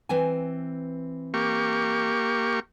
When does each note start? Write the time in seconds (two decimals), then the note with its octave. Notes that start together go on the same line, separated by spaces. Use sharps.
0.09 E3 C4 G#5
1.34 A#3 G4 C#6